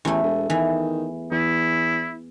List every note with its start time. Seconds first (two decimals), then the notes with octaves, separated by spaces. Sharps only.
0.05 A1 E2 A3
0.23 E1
0.50 D#3 E3
1.32 E2 E4